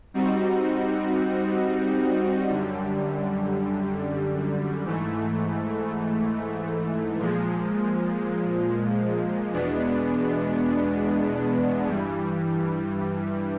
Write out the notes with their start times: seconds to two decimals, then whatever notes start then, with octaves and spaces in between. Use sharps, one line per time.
0.14 G3 C4 D#4 F#4
2.49 F#2 D3 G3
4.83 G#2 E3 A3
7.18 A#2 F3 G#3
9.52 E2 B2 G#3 B3 D4
11.87 G2 E3 G3